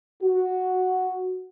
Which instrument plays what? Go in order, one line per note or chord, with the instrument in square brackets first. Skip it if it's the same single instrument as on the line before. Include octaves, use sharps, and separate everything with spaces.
[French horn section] F#4